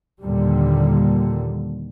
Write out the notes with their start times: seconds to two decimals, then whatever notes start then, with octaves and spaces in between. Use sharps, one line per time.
0.21 D#2 A#2 D3 G3